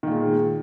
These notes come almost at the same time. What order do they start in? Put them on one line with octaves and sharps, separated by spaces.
D#3 A#2 G#3